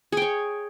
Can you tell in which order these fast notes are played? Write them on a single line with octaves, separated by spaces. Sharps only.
G#4 G5 C#5